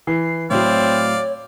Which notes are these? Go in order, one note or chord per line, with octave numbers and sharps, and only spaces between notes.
E3 C7
A2 F#3 C4 C#5 D5 F5